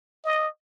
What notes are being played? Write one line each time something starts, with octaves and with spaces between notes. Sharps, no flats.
D#5